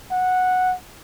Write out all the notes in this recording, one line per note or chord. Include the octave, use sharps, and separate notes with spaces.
F#5